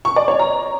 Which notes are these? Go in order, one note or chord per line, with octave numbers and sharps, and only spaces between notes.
C#6
D5
C#5
A#5